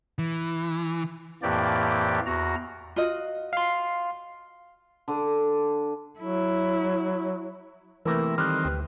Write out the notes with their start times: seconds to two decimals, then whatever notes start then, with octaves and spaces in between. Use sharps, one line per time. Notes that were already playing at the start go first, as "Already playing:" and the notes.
0.19 E3
1.42 F2 A2 E3 A#3 G4 D5
2.26 E2 F#4 A#5
2.96 F4 F#4 D#5
3.53 F5 C6
5.08 D3
6.20 F#3 E4
8.06 C3 E3 A3 A#3 E4 A#4 B4 A#6
8.38 D#3 G3 C4 A4 F6 F#6
8.65 D2 G4 B4